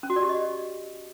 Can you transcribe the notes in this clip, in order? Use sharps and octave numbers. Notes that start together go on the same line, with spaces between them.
C#4
F#4
D5
G4
D#5